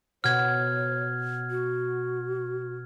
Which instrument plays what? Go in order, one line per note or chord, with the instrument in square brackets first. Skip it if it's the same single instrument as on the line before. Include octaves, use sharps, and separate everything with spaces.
[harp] B2 [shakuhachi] C#5 [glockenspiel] F6 G#6
[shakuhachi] F#4